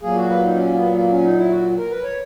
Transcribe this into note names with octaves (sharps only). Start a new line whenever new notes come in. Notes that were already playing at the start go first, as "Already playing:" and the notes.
A#2 F#3 A#3 G#4
F#4
B4
D#4
C#4
B3
A#3
C#4
D#4
E4
F#4
A#4
B4
C#5